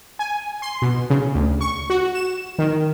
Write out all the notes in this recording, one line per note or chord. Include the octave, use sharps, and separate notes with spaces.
G#5
C6
B2
C#3
D2
C#6
F#4
E7
D#3